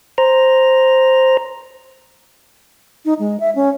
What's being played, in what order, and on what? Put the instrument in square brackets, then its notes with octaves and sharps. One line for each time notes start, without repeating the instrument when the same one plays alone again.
[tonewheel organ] C5 A#5
[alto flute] D#4
G#3
E5
C#4